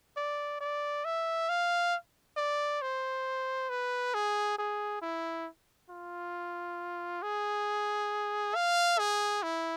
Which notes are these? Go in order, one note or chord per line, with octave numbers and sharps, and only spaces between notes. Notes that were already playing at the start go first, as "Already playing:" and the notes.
D5
D5
E5
F5
D5
C5
B4
G#4
G#4
E4
F4
G#4
F5
G#4
E4